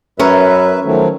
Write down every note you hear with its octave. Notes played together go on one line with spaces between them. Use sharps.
F#2 C#4 A#4 B4 C#5 E5
D#3 F3 F#3 A3